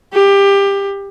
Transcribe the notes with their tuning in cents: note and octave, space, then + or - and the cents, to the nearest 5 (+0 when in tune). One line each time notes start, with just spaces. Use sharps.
G4 +20